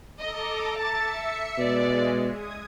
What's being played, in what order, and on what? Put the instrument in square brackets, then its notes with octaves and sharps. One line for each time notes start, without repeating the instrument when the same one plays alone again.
[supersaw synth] A4 A#5 D6 [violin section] D#5
[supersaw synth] E5 C#7 [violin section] A5 A6
[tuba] B2 [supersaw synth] G#3 [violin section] D5
[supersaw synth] D#6 G#6